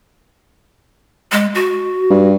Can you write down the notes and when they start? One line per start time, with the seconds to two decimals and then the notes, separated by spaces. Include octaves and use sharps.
1.32 G#3
1.55 F#4
2.11 G2